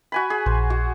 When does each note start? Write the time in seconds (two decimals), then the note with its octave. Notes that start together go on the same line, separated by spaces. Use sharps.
0.12 F#4 G#5 B5
0.30 G#4
0.46 A#1 C5
0.70 F#4